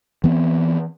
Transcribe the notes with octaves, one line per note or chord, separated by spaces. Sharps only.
E3 B3 C4